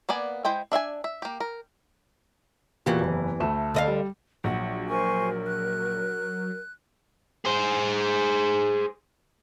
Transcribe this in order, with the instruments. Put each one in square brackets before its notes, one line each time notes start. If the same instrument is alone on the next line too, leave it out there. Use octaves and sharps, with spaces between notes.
[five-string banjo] A#3 B3 D5 G#5
G#3 E4 C5 G5
D4 E5 F5 G#5
E5
A#3 G4
A#4
[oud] E2 E3 G4 [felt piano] A#2 A#3 F#4
[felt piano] F#1
D2 A3 E7
[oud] D3 D#5 F5
[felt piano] G3
[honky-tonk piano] A#1 [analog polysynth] F#3 [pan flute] F#5
[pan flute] A#4 [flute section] C5 G#5 C#6
[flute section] F#6
[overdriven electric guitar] G#4 C5